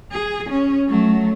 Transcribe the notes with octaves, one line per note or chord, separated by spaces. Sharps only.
G#4
C#4
F#3 A3